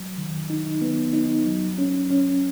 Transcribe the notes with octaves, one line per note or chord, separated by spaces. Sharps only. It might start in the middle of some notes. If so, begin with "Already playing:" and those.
Already playing: F#3
D#3
D#4
B3
D#4
F#3
C#4
C#4